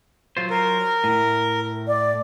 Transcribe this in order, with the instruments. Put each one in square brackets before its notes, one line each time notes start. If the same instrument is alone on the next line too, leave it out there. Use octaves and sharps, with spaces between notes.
[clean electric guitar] F#3 F4 C5
[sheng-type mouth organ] A#4
[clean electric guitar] A2
[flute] D5